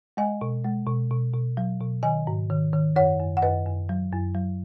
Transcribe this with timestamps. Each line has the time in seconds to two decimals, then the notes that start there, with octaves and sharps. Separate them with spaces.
0.17 G#3 D#5 G#5
0.41 B2
0.64 G#3
0.87 B2
1.11 B2
1.33 B2
1.57 F#3
1.80 B2
2.03 D#3 D#5 G#5
2.27 G#2
2.50 D#3
2.73 D#3
2.96 F#2 C#5 F#5
3.20 F#2
3.37 F#5
3.42 F#2 B4 D#5
3.66 F#2
3.89 F#3
4.12 F#2
4.35 F#3